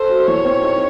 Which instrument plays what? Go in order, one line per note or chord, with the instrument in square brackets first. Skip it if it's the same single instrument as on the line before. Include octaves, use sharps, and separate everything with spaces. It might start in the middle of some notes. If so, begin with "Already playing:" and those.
Already playing: [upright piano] A4 [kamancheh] C5
[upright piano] F#4
[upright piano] E3 [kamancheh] C#5
[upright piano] C4
D#4